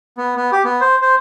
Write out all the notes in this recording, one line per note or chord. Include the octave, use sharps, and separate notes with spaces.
B3
B3
G4
B3
C5
C5